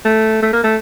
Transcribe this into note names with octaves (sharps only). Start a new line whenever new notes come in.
A3
A3
A#3
A3